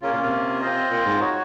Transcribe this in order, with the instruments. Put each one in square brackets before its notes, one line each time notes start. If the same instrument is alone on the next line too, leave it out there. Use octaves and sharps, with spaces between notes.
[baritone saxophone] C#3 [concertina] A#3 C#4 F4
[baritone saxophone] A#2
C3
[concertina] C4 F4 C5 D#5
[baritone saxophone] A#2
G#2
[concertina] D#4 F#4 C#5